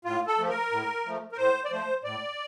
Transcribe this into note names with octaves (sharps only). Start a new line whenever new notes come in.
A2 F4
A4
F3 A3
A#4
A2
F3 A3
A#4
A2 C5
D5
F3 A3 C5
A2 D5